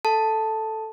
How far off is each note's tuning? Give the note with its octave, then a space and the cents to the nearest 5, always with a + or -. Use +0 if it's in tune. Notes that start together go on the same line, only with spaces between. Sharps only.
A4 +0 A5 +0